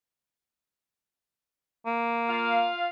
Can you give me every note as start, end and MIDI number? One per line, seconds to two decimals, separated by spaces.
1.86 2.67 58
2.28 2.88 65
2.28 2.88 77